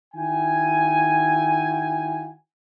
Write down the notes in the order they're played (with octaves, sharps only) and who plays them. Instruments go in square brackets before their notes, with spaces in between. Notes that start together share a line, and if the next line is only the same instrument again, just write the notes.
[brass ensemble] D#3 E4 F#4 G5 G#5